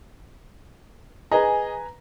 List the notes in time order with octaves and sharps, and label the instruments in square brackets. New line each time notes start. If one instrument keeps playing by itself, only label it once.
[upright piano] G#4 D#5 [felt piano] B4 G#5 A#5